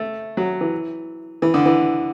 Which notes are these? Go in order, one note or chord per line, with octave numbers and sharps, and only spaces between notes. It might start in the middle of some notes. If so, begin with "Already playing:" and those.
Already playing: A3
F#3
E3
E3
D3
E3